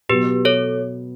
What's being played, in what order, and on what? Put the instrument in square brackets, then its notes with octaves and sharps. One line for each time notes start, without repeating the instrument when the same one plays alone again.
[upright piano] B2 F#3 B3 [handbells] G4 B4
[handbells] A4 C#5